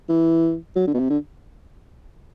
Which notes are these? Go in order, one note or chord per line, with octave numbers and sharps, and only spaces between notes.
E3
F#3
D3
B2
C3
D3